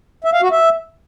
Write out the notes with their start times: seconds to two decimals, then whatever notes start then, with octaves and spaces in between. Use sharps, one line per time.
0.24 E5
0.33 F5
0.42 F#4
0.51 E5